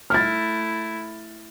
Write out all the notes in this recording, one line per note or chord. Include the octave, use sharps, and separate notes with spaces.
A3 E4 F6 A6